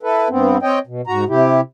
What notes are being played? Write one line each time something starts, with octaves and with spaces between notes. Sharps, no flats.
E4 A4 B4
G2 B3 C4
C4 C#5 D#5 G5
B2
G#2 F#4 A#5
C3 E4 G4